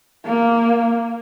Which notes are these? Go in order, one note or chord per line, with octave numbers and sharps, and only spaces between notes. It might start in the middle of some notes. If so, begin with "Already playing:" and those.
A#3